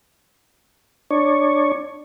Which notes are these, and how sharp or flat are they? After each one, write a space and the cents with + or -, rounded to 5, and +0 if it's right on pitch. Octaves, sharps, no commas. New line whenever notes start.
D4 +15 C#5 +0